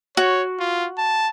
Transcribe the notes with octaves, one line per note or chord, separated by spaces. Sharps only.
F#4 C#5
F4
A5